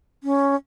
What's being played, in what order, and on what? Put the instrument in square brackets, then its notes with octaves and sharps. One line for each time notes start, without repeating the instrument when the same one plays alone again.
[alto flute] C#4